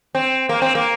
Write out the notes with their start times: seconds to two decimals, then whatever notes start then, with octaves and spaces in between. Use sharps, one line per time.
0.15 C4
0.49 A#3
0.62 C4
0.75 A#3